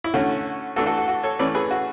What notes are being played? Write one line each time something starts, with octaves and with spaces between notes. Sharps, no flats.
E4
D3 A3 C#4 F#4
E3 A3 D4 F#4 A4
F#4 A4
F#4
F#4
A4 C#5
E3 A3 C#4 B4 D5
G#4 B4
F#4